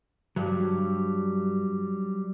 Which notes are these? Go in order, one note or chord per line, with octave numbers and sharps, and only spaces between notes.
G2 F#3 G3